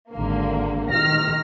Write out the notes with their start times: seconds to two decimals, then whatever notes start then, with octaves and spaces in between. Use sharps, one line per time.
0.11 G#1 D3 A#3
0.90 D#3 F6 A#6